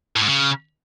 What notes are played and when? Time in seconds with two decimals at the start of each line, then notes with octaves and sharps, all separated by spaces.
0.16 A2
0.22 G#2
0.27 C#3